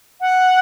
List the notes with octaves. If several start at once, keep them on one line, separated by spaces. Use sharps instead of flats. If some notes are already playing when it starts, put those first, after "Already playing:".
F#5